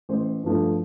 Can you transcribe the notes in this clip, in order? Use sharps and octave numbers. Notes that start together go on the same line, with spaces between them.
A1 C5
G2 F3 A3